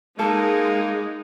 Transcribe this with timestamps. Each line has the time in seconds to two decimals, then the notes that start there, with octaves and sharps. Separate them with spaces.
0.19 G#3 A#3 D#4 A4